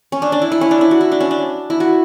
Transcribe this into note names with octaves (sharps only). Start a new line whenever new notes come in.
C#4
D4
D4
E4
E4
C#4
D4
E4
F#4
E4
D4
C#4
D4
E4
F#4